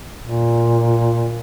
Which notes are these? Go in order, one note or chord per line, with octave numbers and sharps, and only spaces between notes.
A#2